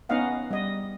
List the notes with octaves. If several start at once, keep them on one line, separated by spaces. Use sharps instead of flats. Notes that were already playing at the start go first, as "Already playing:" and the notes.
B3 C#4 D#4 D#5 F5 F#5
G3 D#5